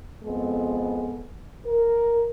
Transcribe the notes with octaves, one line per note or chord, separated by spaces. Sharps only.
F2 G#3 B3 A4
A#4